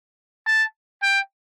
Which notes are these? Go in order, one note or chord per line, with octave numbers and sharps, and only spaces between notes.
A5
G5